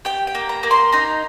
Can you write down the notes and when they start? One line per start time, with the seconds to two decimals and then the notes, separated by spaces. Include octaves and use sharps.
0.05 G4 G5
0.27 G5
0.35 A#3
0.49 A#5
0.63 A#3
0.71 C6
0.92 D#4 A#5